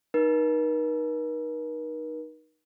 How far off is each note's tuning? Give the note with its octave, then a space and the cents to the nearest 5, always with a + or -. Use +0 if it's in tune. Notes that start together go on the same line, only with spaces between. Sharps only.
D#4 -10 A#4 +45